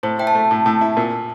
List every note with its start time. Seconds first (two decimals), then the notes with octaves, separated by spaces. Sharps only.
0.03 A2 C5
0.19 E4 G5
0.27 A5
0.35 A3
0.51 A2
0.66 A2
0.81 E4
0.97 A#2